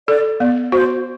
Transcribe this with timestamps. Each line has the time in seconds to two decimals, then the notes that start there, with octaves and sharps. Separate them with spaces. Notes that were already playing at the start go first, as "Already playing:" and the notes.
0.07 A4 D5
0.40 B3 D5
0.72 F#4 C5